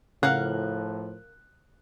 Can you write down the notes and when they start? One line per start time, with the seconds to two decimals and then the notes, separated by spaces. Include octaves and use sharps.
0.23 A2 C#3 F3 A#4 F5 F#5 F#6